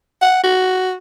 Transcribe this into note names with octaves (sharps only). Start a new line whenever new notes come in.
F#5
F#4